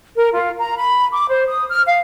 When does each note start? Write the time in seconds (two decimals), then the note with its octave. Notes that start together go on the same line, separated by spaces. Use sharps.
0.16 A#4
0.34 F4
0.58 A#5
0.77 B5
1.12 D6
1.28 C5
1.47 D#6
1.68 F6
1.86 F5